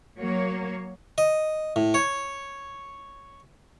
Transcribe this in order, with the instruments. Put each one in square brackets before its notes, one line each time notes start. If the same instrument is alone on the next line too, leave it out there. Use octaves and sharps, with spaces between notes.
[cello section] F#3 A#3 C#5
[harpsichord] D#5
A2
C#5